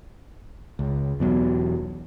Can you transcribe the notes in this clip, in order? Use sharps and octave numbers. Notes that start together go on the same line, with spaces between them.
C#2
E2 B2 F#3